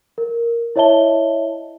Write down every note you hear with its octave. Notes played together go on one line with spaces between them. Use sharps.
A#4
E4 C#5 D#5 E5 A5 G7